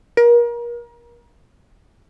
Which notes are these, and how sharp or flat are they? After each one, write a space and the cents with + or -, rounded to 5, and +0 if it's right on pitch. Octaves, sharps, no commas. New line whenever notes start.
A#4 +30